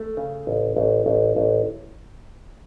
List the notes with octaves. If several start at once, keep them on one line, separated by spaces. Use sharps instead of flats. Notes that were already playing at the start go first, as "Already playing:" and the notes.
Already playing: A3
C#3
A1
A1
A1
A1